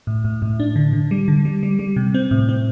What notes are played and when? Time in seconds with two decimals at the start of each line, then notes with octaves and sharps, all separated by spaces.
0.07 A2
0.25 A2
0.42 A2
0.60 D4
0.76 D3
0.93 D3
1.11 G3
1.28 D3
1.45 G3
1.63 G3
1.79 G3
1.96 C3
2.14 C4
2.31 A2
2.49 C4